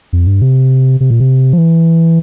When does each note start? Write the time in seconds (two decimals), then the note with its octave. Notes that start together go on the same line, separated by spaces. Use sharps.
0.13 F2
0.27 G2
0.42 C3
1.00 C3
1.10 A#2
1.20 C3
1.53 F3
1.58 E3